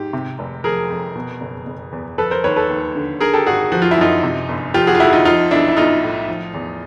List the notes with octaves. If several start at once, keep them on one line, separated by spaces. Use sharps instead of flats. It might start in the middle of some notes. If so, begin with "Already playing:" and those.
Already playing: G#2 G4
C3
F1
F3 G#4 A#4
F2
B2
F#1
F#1
E2
F3 A4 B4
A#4 C5
D#2 B4 C#5
A4 B4
D#2
D3
D3 G#4 A#4
G4 A4
G#1 F#4 G#4
F3 F#4
F4
E4
F#2 D#4 F4
C3
G1
F3 F4 G4
F#4 G#4
F4
F2 E4 F#4
D#4 F4
F3 D#4 F4
B1 D4 E4
E4
B1 D#4 F4
A2
F3
E2